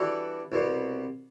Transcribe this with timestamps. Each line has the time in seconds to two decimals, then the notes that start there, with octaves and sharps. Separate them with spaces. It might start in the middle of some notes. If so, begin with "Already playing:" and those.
Already playing: E3 G3 D4 F#4 A4
0.52 C2 B2 G3